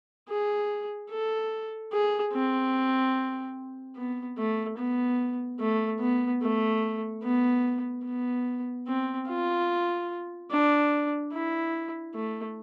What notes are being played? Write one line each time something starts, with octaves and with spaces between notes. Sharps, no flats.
G#4
A4
G#4
C4
B3
A3
B3
A3
B3
A3
B3
B3
C4
F4
D4
E4
A3